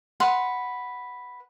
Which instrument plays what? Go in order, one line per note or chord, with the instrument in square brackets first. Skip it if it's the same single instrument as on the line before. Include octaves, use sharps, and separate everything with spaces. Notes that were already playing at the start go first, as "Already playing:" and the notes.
[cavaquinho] B4 F#5 C6